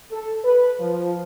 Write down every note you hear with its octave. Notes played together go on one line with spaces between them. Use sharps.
A4
B4
F3